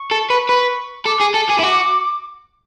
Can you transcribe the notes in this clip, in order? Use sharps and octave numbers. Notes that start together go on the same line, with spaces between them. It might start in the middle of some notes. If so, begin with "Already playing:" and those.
Already playing: C#6
A4
B4
B4
A4 D6
G#4
A4
G#4
E4
F#4